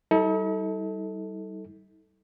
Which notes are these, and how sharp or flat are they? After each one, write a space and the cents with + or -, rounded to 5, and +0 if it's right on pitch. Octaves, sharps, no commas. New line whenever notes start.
G3 -30 D#4 +45 A4 +0